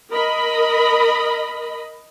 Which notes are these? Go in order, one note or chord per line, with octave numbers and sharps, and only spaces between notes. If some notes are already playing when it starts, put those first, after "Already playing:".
A#4 D#5 B5